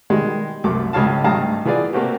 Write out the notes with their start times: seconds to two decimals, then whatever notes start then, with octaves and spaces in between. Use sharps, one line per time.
0.10 B2 D#3 G3 G#3
0.64 C2 F#2 A3 D6
0.93 G#1 C#2 C#3 C#5 F5 A5
1.24 G#1 G2 A3 F5 A5 A#5
1.65 E3 B3 F4 G#4 D5
1.93 A3 A#3 C4 F#4 G4